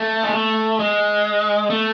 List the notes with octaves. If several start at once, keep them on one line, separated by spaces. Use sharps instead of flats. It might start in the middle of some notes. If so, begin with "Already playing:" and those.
Already playing: A3
G#3
A3
G#3
A3